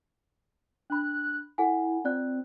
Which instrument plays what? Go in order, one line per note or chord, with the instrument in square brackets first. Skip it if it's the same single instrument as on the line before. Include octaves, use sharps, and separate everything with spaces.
[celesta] D4 B5 [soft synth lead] F#6
[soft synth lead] E4 [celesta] A4 F#5 G#5
[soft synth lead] C4 [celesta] F4 D5 F#6